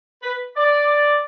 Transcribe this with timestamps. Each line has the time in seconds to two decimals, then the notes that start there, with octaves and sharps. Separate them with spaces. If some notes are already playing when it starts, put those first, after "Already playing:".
0.22 B4
0.57 D5